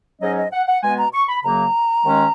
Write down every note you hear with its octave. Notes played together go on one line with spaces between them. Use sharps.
G#2 F#3 C#4 D#5
D#5
F#5
F#5
B2 G#3 B3 G#5
A#5
C#6
B5
F#2 C#3 F#3 A#3 A#5
D#2 D#3 G#3 C#4